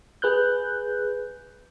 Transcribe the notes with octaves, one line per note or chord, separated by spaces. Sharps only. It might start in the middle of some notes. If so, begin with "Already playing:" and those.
G#4 B4 F#6 G6